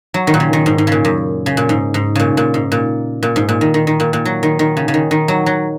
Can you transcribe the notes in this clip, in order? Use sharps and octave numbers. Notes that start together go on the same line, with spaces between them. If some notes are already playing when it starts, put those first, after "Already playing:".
F#3
D#3
A#2
C#3
D#3
G#2
G#2
A#2 C#3
F#2
C#3
A#2
G#2
G#2
A#2 C#3
A#2
G#2
A#2
A#2
G#2
A#2
D#3
D#3
D#3
A#2
A#2
F#3
D#3
D#3
C#3
C#3
D#3
D#3
F#3
F#3